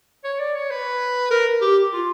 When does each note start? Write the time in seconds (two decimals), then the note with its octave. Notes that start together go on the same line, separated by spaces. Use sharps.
0.24 C#5
0.39 D5
0.55 C#5
0.71 B4
1.31 A#4
1.61 G4
1.92 F4